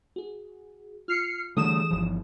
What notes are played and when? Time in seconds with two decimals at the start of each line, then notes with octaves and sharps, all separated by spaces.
0.16 F#4 G#4
1.08 F4 F6 C7 C#7
1.57 D3 E3 G3 A3 G#4 D#6 E7
1.91 G1 C2 F3